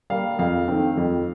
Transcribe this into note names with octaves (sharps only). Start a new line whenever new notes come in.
G3 A#3 F5
F2 F5
D#3 A3 C4
F2